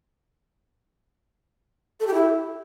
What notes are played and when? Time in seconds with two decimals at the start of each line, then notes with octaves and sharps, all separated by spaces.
2.00 A4
2.07 G4
2.14 E4